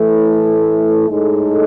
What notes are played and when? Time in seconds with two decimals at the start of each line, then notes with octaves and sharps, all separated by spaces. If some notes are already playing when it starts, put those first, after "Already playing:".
Already playing: A2 E3 A3 E4 A4
1.09 A2 G#3 D#4 A4